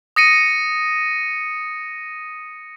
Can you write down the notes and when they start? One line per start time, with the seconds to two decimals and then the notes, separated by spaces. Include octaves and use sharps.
0.16 D#6 A#6 C#7 D#7